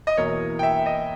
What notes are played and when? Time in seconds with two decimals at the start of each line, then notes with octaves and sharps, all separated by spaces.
0.07 D#5
0.17 E2 B2 A#3 E4 A#4 C#5
0.59 G5
0.63 E5
0.86 D#5